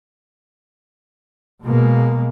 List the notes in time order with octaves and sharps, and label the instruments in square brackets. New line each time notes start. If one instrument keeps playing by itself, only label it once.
[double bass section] B2 G#3 A#3